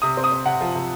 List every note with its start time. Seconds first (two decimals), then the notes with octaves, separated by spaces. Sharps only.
0.02 C3 D#6
0.17 C4
0.24 D#6
0.32 C4
0.45 C3 F#5
0.61 F3
0.75 C3